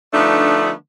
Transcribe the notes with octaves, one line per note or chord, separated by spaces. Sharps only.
D3 F3 A3 B3 D4 D#4